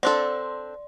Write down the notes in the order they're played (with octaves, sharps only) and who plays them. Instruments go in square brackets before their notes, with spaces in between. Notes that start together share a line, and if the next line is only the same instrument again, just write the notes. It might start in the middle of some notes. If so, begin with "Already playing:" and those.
[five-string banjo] C4 D4 A4 [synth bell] D5 C6